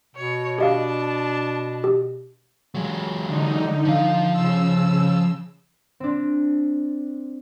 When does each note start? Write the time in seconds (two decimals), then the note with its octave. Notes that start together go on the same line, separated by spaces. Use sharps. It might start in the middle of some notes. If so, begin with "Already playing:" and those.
0.15 B2 C#5
0.58 D4 G4 D#5 F5 A5
1.84 G4
2.75 F#3 G#3
3.26 D3 D#4
3.85 F3 F5
4.32 C#3 E6
6.00 C4 D4